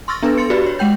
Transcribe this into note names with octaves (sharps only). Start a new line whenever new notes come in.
C6 C#6 E6 F6 A6 A#6
B3 D4 A4 B4
C6 A6 C#7
F#4 G4 B4 D5 B5
C#5
G#3 F#5 G5 G6